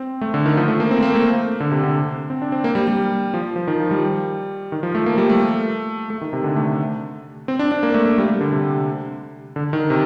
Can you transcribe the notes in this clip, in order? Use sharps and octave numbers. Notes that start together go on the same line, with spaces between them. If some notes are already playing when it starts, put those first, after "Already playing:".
Already playing: C4
A3
D3
D#3
F3
A3
A#3
C4
A#3
A3
D3
C3
D3
C4
D4
C4
A#3
G3
G3
F3
F3
D#3
F3
G3
D#3
F3
A3
A#3
G3
A3
A3
D#3
C3
D3
A3
C4
D4
D4
A#3
A3
A3
G3
G3
D3
C3
D3
D#3
C3